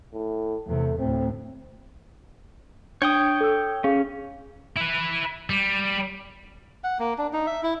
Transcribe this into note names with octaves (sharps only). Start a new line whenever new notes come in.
A2
E2 C3 A3
D2 A2 C4
D4 C#5 G5 D#6
A4 E6
C#4 G#4 F5
E4 B4
G3
F#5
A#3
D4
D#4
E5
E4